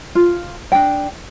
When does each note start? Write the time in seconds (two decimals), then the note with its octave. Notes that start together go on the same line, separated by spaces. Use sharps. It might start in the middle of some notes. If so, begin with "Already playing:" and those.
0.15 F4
0.72 D4 G5